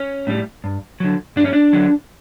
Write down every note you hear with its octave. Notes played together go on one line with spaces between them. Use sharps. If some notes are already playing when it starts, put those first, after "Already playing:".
Already playing: C#4
A2 G3
G2
D3 F#3
G2 D4
C#4
D4
D3 F#3